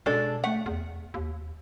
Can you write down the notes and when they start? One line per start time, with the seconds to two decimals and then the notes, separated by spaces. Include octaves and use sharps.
0.06 B2 G#3 D4 A4
0.44 A3 F#5
0.66 E2
1.14 D#2